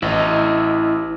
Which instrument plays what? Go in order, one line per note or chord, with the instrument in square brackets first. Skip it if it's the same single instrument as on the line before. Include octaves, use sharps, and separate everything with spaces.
[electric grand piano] A1 [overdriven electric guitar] E4 D#5